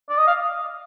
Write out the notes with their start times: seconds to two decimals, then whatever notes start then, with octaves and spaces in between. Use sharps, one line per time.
0.09 D5
0.17 D#5
0.27 F5